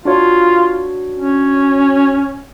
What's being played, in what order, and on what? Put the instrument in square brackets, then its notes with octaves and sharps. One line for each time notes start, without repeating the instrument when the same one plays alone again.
[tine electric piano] D4 F#4 C#5 [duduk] F4
[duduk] C#4